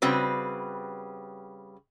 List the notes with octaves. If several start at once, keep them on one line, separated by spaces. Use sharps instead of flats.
C#3 G3 C4 F#4 B4